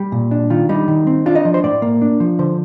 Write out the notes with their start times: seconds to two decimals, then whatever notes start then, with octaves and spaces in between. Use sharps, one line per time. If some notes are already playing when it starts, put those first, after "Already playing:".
Already playing: G3 G4
0.12 A#2
0.31 D4
0.50 D#3 F4
0.69 G3 D#4
0.88 D#3
1.07 C4
1.26 D4 F4
1.35 D#5
1.45 F3
1.54 C5
1.64 A2 D5
1.82 A#3
2.02 D4
2.20 F3
2.39 D3 C5